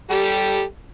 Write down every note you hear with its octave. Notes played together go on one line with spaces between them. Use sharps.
G3 G4 A4